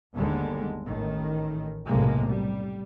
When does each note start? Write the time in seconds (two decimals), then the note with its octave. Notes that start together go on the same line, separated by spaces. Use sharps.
0.13 G1 D#2 D3 G3 G#3
0.86 A1 A2 D#3
1.87 F1 B1 A2 C3 G#3 A#3
2.28 G3